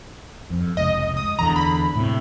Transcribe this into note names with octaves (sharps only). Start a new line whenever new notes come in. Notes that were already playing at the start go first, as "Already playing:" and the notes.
F2
F1 C#2 D#5
D#6
E2 D3 A#5
B5
A2 C3